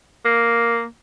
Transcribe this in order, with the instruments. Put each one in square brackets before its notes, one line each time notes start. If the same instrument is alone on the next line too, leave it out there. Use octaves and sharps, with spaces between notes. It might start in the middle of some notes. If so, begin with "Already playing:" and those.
[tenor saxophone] A#3